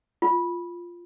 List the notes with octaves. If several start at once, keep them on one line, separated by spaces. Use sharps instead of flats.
F4